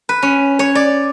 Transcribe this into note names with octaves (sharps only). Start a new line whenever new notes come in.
B4
C#4
C#5
D5